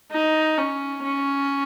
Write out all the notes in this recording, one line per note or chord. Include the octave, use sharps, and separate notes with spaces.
D#4
C#4
C#4